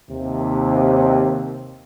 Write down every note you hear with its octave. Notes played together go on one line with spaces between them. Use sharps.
D#2 C3